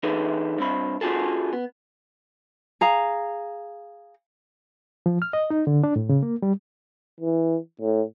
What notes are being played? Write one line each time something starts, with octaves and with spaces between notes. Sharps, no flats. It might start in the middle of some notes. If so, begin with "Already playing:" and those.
E3 D#4 G#4 A4 B4
G2 C4 B5
C#4 F4 F#4 G#4 A4
B3
G#4 F5 A#5
F3
F6
D#5
D#4
D3
D4
A2
C#3
A#3
G3
E3
A2